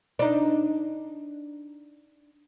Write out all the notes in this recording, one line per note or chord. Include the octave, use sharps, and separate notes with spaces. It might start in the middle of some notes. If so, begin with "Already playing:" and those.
D4 D#4